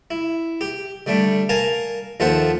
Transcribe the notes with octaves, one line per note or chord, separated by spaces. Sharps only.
E4
G4
D3 G3 A3 D4
A#4 F5 G#5 A5
D#2 F3 A4 C5 E5 F#5